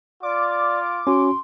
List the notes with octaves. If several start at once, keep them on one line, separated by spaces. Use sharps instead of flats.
F4 D5 D6
C#4 F#4 C6